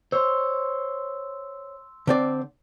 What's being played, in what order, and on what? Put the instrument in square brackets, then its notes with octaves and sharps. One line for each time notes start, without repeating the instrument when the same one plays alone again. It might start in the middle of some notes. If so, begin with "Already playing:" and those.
[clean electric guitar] C5 C#5 [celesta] C6 E6
[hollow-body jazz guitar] D3 C4 D5